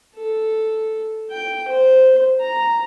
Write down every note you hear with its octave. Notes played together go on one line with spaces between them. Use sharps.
A4
G5
C5
A#5